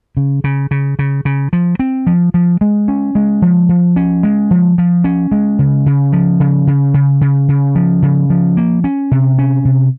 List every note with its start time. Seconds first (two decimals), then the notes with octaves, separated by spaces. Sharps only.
0.17 C#3
0.44 C#3
0.71 C#3
0.99 C#3
1.25 C#3
1.53 F3
1.79 C4
2.07 F3
2.34 F3
2.61 G#3
2.88 C#4
3.15 G#3
3.42 F3
3.69 F3
3.96 C#4
4.23 G#3
4.51 F3
4.78 F3
5.04 C#4
5.32 G#3
5.59 C#3
5.86 C#3
6.13 F3
6.40 C#3
6.67 C#3
6.94 C#3
7.21 C#3
7.49 C#3
7.75 F3
8.02 C#3
8.30 F3
8.57 A#3
8.84 C#4
9.11 C3
9.39 C#4
9.65 C3